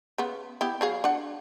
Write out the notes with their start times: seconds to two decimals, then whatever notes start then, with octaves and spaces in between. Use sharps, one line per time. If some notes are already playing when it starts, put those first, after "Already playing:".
0.18 C#3 B3
0.61 B3 E4 G4
0.81 F#3 G#4 F5
1.04 D4 F#5